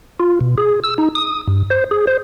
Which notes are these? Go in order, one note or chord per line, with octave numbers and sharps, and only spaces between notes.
F4
B2
G#4
E6
D#4
D#6
G2
C5
G#4
C5